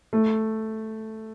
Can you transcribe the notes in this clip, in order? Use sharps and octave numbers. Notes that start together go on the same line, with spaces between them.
A3